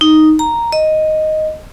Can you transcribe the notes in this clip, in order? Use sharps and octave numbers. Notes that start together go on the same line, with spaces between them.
D#4
A#5
D#5